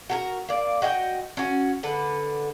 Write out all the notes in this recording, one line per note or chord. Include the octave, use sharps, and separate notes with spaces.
F#4 A4 A#4
A#3 D5
F#4 D#5 F#5 G5
C#4 F#4
D3 A4 B4